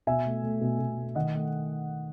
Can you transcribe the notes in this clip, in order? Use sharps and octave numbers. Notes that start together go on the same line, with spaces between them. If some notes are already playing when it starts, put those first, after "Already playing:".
B2 E5 G#5
A3
A3
B2
B2
A3
D#3 D#5 F#5
A3